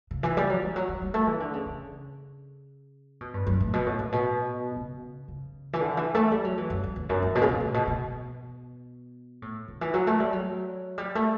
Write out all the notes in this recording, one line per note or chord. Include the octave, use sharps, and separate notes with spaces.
C#3
E3
G3
F#3
E3
F#3
F#3
G3
A3
E3
D3
C#3
C#3
B2
G2
F#2
A2
B2
A2
A2
B2
C#3
C#3
E3
D3
E3
A3
G3
F#3
E3
F#2
F#2
E2
F#2
G2
B2
C#3
B2
A2
B2
B2
A2
D3
E3
F#3
A3
G3
F#3
G3
A3